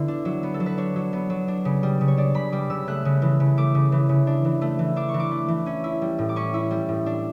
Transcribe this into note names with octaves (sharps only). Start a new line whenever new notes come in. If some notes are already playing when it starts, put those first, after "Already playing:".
Already playing: D3 B3 E4
D4
F#3
B3
A4
F#3
B4
D4 C#5
F#3
B3
F#3
D4
C#3
G3
C#3
C#5
D4 D5
C#3 B5
G3 D6
C#3 E6
A3 F#6
C#3
E3
C#3
A3 D6
C#3
E3
C#3
D4
E3
A3
E3
D4 D6
C#6
E3
D6
A3
E3
C#4
E4
G3
A2
D6
C#4 C#6
E4
G3
A2
D4